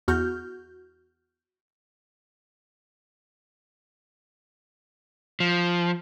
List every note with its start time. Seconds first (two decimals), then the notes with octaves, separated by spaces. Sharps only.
0.08 E2 F#4 F6 G6
5.40 F3